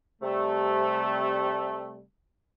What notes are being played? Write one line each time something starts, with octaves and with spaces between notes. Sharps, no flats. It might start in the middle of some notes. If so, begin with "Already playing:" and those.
C3 G3 A3